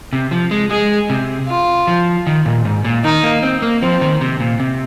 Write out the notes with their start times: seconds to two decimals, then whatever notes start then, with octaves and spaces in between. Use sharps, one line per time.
0.13 C3
0.31 F3
0.51 G#3
0.71 G#3 G#4
1.10 C3
1.48 F4
1.87 F3
2.27 D#3
2.46 A#2
2.65 G#2
2.85 A#2
3.04 D#3 D#4
3.24 A#3
3.43 C4
3.62 A#3
3.82 F3 C4
4.01 D#3
4.21 C3
4.40 A#2
4.60 C3